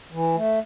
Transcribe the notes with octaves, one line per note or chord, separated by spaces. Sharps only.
E3
A3